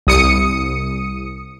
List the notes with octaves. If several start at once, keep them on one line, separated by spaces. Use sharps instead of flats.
C2 D#6 C#7